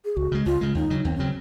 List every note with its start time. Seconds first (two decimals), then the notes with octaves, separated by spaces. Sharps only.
0.05 G#4
0.16 C#2 F#4
0.32 C#3 G#3
0.46 C#2 F4
0.61 C#3 G#3
0.75 D#2 D#4
0.90 C#3 F#3
1.05 D#2 C4
1.16 C#4
1.19 C#3 F#3 C4